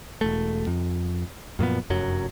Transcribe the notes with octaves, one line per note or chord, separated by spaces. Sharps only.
E1 A3
F2
F#2 A#2 F3 B3
F1 F#2 F#3